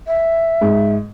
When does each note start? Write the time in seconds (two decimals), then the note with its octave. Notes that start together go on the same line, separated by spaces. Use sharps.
0.07 E5
0.61 G#2